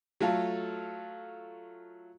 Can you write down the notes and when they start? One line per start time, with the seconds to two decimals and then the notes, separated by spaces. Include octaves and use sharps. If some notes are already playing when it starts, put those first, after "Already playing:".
0.21 F#3 A3 F4 A4 F5